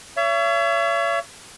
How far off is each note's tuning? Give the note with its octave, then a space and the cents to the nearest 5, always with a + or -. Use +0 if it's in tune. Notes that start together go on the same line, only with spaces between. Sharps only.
C#5 +30 E5 +40